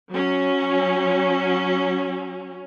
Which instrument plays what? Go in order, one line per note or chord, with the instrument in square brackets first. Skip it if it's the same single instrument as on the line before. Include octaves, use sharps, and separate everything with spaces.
[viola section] F#3 C#4